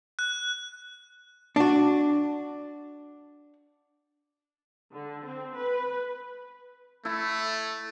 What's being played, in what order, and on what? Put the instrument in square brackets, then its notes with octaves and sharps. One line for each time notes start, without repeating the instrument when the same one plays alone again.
[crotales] F#6
[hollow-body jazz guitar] D4 F#4
[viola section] D3
C4
B4
[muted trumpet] A3 [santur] E4